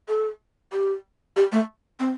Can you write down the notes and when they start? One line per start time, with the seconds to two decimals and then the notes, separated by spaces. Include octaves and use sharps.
0.09 A4
0.73 G4
1.36 G4
1.52 A3
2.00 C4